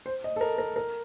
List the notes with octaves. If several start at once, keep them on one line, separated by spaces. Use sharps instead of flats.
C5
D#5
A4
A#4
A#4
A#4